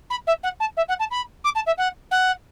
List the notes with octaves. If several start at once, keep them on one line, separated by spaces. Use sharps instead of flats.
B5
E5
F#5
A5
E5
F#5
A5
B5
D6
A5
E5
F#5
F#5